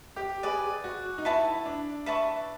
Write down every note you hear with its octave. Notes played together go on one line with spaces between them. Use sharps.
G4
G#4 B4 D5
F#4
D#4
E4 B4 E5 A5 C#6
D4
B4 E5 A5 C#6